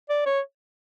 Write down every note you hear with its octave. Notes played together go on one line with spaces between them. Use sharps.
D5
C#5